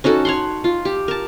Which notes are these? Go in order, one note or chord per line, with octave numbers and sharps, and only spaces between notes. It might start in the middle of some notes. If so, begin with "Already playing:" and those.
C#4 D#4 F#4 A4
C#5 F#5 C6
F4
G4
A#4 A5